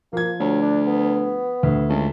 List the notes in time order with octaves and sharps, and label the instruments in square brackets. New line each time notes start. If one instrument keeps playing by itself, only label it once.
[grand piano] F3 G#6 [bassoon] A#3
[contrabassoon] D2 [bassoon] F#3
[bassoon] D4
B3
[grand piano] D2
[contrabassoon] C#2